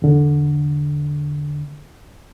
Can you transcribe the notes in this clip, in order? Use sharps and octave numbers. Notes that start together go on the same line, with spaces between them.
E2 D3